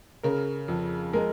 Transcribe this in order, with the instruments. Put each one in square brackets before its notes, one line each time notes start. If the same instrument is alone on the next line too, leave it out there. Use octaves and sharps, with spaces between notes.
[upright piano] C#3 [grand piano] A#4
[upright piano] F2
[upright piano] G#3 [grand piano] A#4